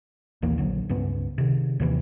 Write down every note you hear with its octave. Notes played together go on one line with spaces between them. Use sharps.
A#1 D#2 E3 A#3
A#1 D3 F#3
C#2 G2 B3
C3 D#3
D#2 C3 D#3 E3